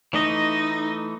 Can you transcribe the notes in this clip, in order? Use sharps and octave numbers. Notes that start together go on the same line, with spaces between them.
E3 A3 D#4 D#5